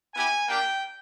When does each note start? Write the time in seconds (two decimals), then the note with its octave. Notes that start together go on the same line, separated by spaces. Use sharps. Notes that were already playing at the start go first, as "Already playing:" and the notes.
0.15 B3 E4 G4 G#5
0.48 A#3 D4 G4 G5